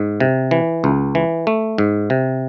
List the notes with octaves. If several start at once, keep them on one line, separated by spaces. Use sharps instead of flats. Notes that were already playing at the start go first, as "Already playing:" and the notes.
Already playing: G#2
C3
E3
C#2
E3
A3
G#2
C3